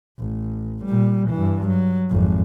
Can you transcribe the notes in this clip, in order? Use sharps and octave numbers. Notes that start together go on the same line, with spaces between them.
A1
A#2 G3
G2 E3
F#3
G#1 F2